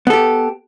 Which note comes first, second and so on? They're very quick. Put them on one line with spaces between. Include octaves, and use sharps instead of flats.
B3 A4 G4